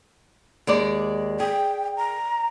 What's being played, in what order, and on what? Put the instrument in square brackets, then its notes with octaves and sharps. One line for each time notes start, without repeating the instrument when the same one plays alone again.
[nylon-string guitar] D#2 G#3 D5
[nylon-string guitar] G#4 [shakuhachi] G5
[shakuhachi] A#5